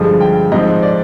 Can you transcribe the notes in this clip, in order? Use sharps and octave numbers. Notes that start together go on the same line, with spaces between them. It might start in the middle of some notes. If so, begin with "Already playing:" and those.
Already playing: G2 D3 F3 G#3
G5
G#2 F3 C4 D#5
D5